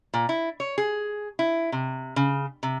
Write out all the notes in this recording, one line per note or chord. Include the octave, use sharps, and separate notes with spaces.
A#2
E4
C#5
G#4
E4
C3
C#3
C3